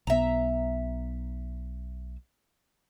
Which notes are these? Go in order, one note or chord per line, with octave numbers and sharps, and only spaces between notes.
B1 B3 E5 A#5